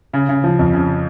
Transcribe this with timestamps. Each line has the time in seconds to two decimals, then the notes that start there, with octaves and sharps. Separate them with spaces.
0.14 C#3
0.29 C#3
0.44 F3
0.59 F2
0.73 C#3